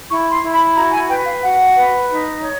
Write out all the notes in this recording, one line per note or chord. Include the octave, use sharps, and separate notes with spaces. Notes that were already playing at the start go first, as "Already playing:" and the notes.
E4 C#6
C6
E4
B5
F#4 A#5
G#5
B4 G5
F5
F#4 F#5
B4
D#4
C#5